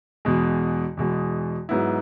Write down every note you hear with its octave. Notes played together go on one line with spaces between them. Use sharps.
E2 B2 G#3
E2 B2 G#3
G#2 F#3 B3 E4